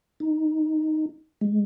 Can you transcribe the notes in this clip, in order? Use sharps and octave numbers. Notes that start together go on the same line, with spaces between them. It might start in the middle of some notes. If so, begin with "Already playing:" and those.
D#4
G#3